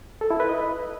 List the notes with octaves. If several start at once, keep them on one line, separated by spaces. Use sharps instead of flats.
A4
E4
B4
D#5